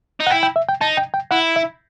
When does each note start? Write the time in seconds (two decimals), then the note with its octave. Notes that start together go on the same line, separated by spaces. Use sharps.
0.20 D#4
0.27 F#5
0.31 E4 G5
0.43 G5
0.56 E5
0.68 G5
0.81 D#4 A5
0.97 G5
1.14 G5
1.31 E4 F#5
1.56 E5